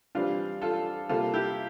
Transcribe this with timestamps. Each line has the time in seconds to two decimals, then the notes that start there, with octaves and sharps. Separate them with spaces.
0.15 E3 G3 C4 D4 F4
0.62 F4 A4
1.09 C3 G3 A#3 F4 A4
1.34 E4 G4